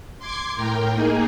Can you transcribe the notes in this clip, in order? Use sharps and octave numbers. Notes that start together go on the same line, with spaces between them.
C6 D6 G#6 C7
A2 A#4 G5
A#3 D#4 G#4